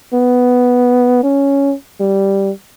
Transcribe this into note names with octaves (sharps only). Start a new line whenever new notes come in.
B3
C#4
G3